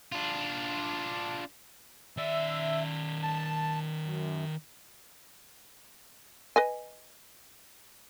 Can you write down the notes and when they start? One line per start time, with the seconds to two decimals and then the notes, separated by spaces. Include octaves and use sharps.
0.12 D4 F4
2.17 D#3 D5 E5
3.23 A5
4.04 F#2
6.56 B4 D#5 G#5